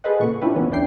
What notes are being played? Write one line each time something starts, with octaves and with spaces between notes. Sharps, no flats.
G#4 A4 B4 C5 D#5 F#5
A#2 C#3 C#6
C#4 D4 E4 F4 G4 B4
D3 E3 A#3 B3 C#4
E2 E3 D4 E4 G5 C7